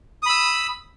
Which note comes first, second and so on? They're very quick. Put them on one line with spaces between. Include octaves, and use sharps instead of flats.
D#6 B5 E6